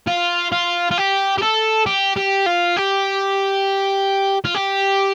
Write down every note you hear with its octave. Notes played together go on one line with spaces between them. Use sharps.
F4
F4
F4
G4
G4
A4
G4
G4
F4
G4
F4
G4